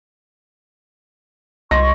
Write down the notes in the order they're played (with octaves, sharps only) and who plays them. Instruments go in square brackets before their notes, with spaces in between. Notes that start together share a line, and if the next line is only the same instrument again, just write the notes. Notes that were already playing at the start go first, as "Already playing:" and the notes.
[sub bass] C2 [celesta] D#5 [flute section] C6 C#6 [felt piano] A#6